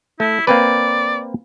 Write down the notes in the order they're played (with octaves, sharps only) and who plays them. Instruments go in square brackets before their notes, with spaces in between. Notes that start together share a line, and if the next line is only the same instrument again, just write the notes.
[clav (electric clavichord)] A3 [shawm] E4
[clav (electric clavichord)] A#3 C4 B4 [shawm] D5